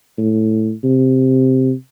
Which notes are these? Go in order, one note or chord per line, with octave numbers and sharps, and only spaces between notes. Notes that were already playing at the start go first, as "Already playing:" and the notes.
A2
C3